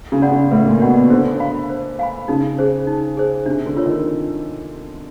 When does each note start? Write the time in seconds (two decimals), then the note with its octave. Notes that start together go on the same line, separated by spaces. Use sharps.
0.12 C#3
0.22 D5 F#5 B5
0.32 C#3
0.51 A2 B4
0.66 A#2
0.81 B2 D5 F#5 B5
0.95 B2
1.10 D3 C5
1.40 F5 G#5 B5
1.69 C5
1.99 F5 G#5 B5
2.28 C#3 D#4
2.58 G#4 C5
2.87 D#4
3.17 G#4 C5
3.46 C3 D4
3.66 D3
3.76 F4 A#4 C#5
3.86 D#3